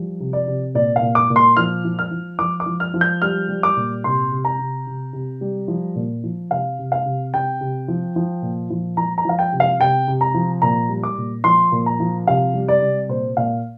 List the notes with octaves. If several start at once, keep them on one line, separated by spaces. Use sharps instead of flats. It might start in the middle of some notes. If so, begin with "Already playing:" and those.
Already playing: F3 G3
C3
D5
C3
A#2 D5
F5
A#2
D6
A#2
C6
F3 F6
F3
F6
F3
F3 D6
D6
F3
F6
F3
G6
G3 F6
G3
D6
A#2
C3 C6
C3
A#5
C3
C3
C3
G3
F3
A#2
F3
C3 F5
C3
F5
C3
C3 G5
C3
F3
F3
A#2
F3
F3 A#5
A#5
F3 F5
G5
C3
F5
C3 G5
C3
A#5
F3
A#2 A#5
G3
D6
A#2
F3 C6
A#2
A#5
F3
C3 F5
G3
D5
C3
A#2 C5
A#2 F5